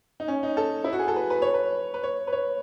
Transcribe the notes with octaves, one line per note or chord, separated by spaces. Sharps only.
D#4
C#4
D#4
A4
E4
F#4
G#4
A4
B4
B4
C#5
B4
B4
C#5
B4
C#5